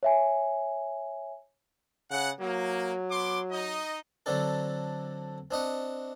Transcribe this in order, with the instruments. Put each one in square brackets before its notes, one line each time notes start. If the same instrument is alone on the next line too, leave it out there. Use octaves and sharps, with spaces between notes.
[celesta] C#5 E5 G#5
[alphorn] C#3 [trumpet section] F#5
[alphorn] F#3 [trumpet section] A#3
[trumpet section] B3 C6 D6
D#4 D#5
[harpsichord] D3 F#3 C4 D4 A4
C4 D4 D#5 F#5